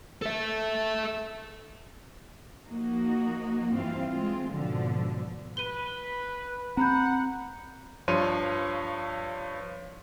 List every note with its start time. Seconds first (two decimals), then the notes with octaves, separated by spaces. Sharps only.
0.22 A4 E5
2.69 F3 A#3 D#4 F#4
3.72 G2 E3 C4 F4 F5
4.10 G#3 C4 F4
4.51 G#2 B2 D3 F3 F#3
5.57 B4 D#7 G7
6.77 C4 F#5 A#5 B5 G6
8.08 G2 F3 C#5 C6 D#7